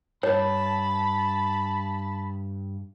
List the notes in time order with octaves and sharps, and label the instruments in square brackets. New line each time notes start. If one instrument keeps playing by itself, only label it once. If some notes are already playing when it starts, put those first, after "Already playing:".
[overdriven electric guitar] G2 [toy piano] C#5 [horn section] A5 B5